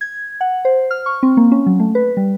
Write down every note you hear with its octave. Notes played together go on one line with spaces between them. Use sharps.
G#6
F#5
C5
F6
C#6
C4
A#3
C#4
F#3
A3
B4
G3